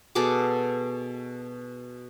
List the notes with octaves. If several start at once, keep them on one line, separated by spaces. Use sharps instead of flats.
B2 G#4 A4 D6